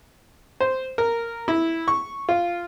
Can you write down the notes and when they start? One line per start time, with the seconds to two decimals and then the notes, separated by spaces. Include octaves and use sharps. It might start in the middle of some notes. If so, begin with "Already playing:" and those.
0.60 C5
0.98 A#4
1.48 E4
1.88 C#6
2.29 F4